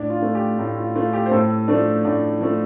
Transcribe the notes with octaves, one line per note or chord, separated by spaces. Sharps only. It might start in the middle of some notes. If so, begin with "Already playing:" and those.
Already playing: A2 D4
F4
A3
G4
A2
F4
A3 F4
G4
C5
A2 A4
F3 A3 D4
A2 D4
F3 A3